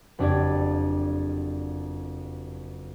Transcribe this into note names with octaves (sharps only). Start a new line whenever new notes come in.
F#1 F2 D4 G4 D5 G#6